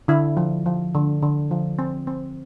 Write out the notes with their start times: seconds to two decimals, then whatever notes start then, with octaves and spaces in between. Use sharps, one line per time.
0.08 D3 E4
0.37 F3
0.66 F3
0.94 D3
1.22 D3
1.51 F3
1.79 C4
2.07 C4